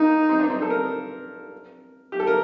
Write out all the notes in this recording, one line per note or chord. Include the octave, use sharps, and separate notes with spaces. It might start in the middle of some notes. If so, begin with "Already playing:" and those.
Already playing: A#3 D#4
C4
D4
C4
A4
A#4
G4
A4
A#4